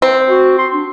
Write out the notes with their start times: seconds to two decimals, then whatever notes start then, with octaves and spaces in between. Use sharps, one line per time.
0.02 C4
0.29 F#4
0.58 C6
0.73 D4